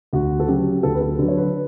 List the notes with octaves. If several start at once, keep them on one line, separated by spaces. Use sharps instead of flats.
D2 F#4
A4
C#3 F#3 G4
D2 A4
B4
A4
D3 F#3 B4
C#5
B4